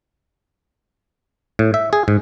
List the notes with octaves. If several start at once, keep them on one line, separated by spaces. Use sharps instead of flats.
A2
E5
G#4
G#2